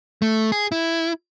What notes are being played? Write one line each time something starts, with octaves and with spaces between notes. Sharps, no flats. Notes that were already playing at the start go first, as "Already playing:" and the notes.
A3
G#4
E4